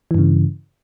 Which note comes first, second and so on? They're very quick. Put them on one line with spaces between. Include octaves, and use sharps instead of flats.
E3 G2 C#3